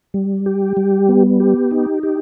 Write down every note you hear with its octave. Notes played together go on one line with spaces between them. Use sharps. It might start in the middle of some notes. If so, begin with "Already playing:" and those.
G3
G4
G3
B3
G4
D#4
G4